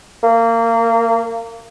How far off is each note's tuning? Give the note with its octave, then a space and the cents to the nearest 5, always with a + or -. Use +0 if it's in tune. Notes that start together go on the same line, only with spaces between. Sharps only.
A#3 -25